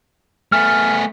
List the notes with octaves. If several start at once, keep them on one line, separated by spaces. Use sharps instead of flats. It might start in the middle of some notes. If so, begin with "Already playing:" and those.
A3 B3 G#5 F6